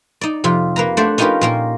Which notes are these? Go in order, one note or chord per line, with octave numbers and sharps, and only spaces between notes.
D#4 D5
F2 C3 F4
A#3 B4 A#5
A3 D4 C5 D5 F#5
C#4 D#4 F4 G4 A#4 B4
A#2 A#3 A#4